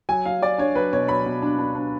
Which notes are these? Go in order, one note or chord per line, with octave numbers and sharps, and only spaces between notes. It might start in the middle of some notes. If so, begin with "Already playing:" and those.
F#3 G#5
F#3 F5
F#3 D5
D4 C#5
F#3 B4
B2 C#5
F#3 B5
B2
D4
D4
D4